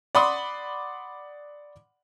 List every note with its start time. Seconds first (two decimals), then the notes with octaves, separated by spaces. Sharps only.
0.15 D5 F#5 B5 C6 D6 D#6